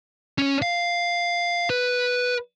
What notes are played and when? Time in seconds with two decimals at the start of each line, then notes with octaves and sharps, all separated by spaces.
0.38 C#4 C#5
0.62 F5
1.70 B4